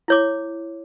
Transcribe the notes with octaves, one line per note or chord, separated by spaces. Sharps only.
E4 C#5 D6